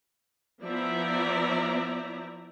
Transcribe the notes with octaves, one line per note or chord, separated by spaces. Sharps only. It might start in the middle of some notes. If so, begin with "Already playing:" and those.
F3 B3 E4 D5 E5 A#5